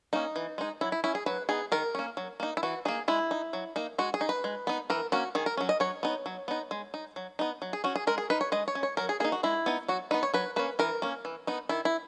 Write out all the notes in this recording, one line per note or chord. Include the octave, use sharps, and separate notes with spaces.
A#3 C#4 D#4
E3
G#3 D#4
F#3 E4
E4
C#4 E4
G#4
F#3 B4
B3 D#4 G#4
D#3 A#4
A#3 C#4
F#3
A#3 D#4
E4
E3 F#4
A#3 D#4 G#4
G#3 E4
D#4
F#3
A#3 D#4
G#3 F#4
G#4
D#4
B4
G#3
B3 D#4
E3 A#4
A#3 C#4 F#4
D#3 G#4
A#4
F#3 C#4
D#5
F#3 C#5
B3 D#4
F#3
B3 D#4
G#3
D#4
F#3
B3 D#4
F#3
G#4
C#4 F#4
G#4
G#3 A#4
G#4
D#4 B4
C#5
G#3 D#5
C#5
C#4
C#5
F#3 A#4
G#4
A#3 D#4 G#4
F#4
G#3 E4
B3 D#4
F#3 F#4
B3 D#4 B4
C#5
F#3 B4
A#3 C#4 B4
E3 A#4
A#3 C#4
E3
B3 D#4
D#3 E4
E4